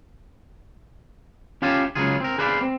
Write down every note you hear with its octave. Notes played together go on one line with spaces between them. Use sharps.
C#4 F4 G4 F5 G#5 A5
C#2 C#3 F#3 F4 G#4
C4 A#4
G#4 B4 C5 D5 F5
C4